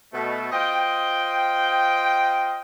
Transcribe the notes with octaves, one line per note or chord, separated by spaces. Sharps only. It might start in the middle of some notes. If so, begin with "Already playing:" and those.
B2 A3
F4 C5 D#5 G5